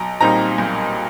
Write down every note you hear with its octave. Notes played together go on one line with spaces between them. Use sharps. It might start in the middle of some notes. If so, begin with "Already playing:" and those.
Already playing: B1 A#5
A#2 G3 C4 D#4 A#5
B1